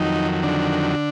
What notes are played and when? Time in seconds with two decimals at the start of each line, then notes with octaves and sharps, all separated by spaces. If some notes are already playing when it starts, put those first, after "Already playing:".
Already playing: F2 D#3 F#3 D#4
0.43 D3 D4